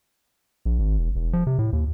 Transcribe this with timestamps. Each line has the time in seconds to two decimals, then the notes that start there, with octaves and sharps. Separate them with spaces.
0.65 A#1
0.79 G#1
0.98 E1
1.16 E1
1.33 F3
1.47 C3
1.59 A2
1.73 D#2